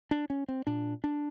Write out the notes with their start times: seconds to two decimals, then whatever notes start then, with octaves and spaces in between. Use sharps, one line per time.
0.11 D4
0.30 C#4
0.48 C4
0.67 A#2 D4
1.04 D4